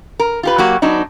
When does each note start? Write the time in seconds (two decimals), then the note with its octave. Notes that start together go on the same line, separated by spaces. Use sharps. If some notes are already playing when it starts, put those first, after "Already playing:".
0.20 A#4
0.43 F4 G4 B4
0.58 F#3 A#3 F#4 G4
0.82 F#3 B3 D4 D#4